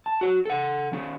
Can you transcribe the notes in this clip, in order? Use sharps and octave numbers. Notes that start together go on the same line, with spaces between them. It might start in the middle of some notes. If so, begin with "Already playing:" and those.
A5
F#4 C#5
A4 F#5
D#3 C#4